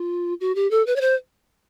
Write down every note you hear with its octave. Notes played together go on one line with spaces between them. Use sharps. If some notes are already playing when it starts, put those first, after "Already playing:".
Already playing: F4
F#4
G4
A4
B4
C#5
C5